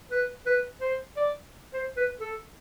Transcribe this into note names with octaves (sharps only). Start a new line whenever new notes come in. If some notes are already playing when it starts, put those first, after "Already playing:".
B4
B4
C5
D5
C5
B4
A4